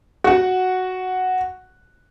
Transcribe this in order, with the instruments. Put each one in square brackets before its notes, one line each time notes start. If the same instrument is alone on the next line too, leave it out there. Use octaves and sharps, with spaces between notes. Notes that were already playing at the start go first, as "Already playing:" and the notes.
[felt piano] F#4 F#5